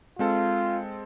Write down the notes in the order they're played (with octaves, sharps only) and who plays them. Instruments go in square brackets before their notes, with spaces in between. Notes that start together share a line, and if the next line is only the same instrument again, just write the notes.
[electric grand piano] G#3 C4 A4 [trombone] F4